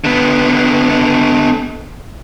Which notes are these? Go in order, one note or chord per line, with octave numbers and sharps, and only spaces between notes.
D3 B3